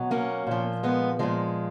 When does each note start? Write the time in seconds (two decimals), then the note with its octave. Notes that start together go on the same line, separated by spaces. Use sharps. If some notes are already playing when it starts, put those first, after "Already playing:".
Already playing: B2 F#3
0.11 A#3 C#4
0.47 A#2 F3
0.83 G#3 B3
1.19 A#2 F3 G#3